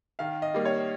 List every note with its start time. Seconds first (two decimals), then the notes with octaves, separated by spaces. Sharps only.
0.19 D#3 F5
0.42 D#5
0.54 G3 A#3
0.65 C#5